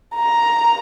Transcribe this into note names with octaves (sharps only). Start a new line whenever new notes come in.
A#5